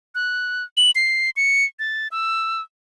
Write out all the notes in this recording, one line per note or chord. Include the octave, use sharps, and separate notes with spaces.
F#6
F#7
C7
C#7
A6
E6